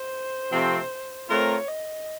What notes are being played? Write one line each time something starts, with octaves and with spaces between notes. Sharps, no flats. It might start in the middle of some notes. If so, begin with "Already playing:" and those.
Already playing: C5
C3 F3 A3 C4
A3 C4 F4 A#4 C#5
D#5